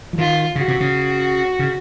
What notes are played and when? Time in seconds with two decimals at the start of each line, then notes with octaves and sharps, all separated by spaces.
0.13 F3
0.18 D#3 F4
0.56 C#3 F#4
0.68 C3
0.80 C#3
1.59 C#3